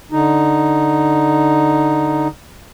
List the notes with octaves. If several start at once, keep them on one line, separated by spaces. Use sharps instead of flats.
D3 D#4